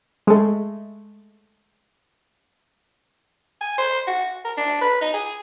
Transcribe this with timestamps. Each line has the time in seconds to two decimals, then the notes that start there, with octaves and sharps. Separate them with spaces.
0.27 G#3 A3
3.61 G#5
3.78 C5
4.07 F#4
4.45 A#4
4.57 D4
4.81 B4
5.01 D#4
5.14 G#4